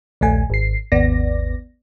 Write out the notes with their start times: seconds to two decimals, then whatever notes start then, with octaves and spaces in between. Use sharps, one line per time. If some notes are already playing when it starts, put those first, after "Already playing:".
0.21 A#1 D#2 A3 G#5
0.50 G#1 C7
0.92 G#1 D#2 B3 D5 A#6